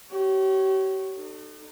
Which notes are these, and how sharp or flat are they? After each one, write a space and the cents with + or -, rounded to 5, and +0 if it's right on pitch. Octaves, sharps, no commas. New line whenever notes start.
G4 -40 C#5 -5
D#4 -45 A4 +10